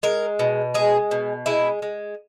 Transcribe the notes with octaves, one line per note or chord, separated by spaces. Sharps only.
G#3 A#4
B2
G#3 G#4
B2
G#3 E4
G#3